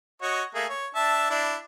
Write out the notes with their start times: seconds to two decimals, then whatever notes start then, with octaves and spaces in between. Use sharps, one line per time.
0.22 F#4 C#5 D#5
0.55 A3 A#3 G#4
0.69 C#5
0.95 D4 E5 A5
1.30 D4 E4